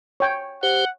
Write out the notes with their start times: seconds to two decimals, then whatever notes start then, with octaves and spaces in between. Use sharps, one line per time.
0.20 C#5 G5
0.63 G4 C5 F#5